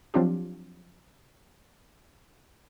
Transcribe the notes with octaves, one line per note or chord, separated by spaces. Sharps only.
F3 F#3 C4 D4 F4 G4